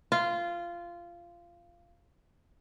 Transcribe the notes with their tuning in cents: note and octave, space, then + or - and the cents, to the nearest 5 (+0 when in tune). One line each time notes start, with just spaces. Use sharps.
F4 -15